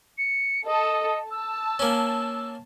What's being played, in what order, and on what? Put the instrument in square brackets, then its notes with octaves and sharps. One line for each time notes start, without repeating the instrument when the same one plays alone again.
[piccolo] C#7
[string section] A4 [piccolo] D#5
[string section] A5 [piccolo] E6
[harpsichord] A#3 C#4